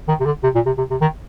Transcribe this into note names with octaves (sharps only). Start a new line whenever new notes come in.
D#3
C3
D3
C3
A#2
C3
C3
C3
D#3